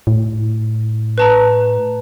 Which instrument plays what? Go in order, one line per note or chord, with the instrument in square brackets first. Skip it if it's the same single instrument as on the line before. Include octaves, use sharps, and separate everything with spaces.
[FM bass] A2
[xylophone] B4 A5 A#5